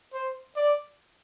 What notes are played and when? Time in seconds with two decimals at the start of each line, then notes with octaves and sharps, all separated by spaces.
0.14 C5
0.56 D5